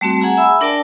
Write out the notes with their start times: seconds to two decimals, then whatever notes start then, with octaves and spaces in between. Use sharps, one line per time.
0.01 G3 A3 C4 F#4
0.21 G#4 F#5 G#5 A#5
0.37 E5 G#5 B5 E6
0.61 D4 A#4 D5 G5 A5